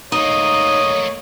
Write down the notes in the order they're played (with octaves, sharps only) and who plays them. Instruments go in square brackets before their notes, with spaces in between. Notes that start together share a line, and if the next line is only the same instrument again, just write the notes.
[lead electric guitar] A3 A#3 [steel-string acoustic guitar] D#4 [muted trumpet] C#5 [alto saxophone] D#5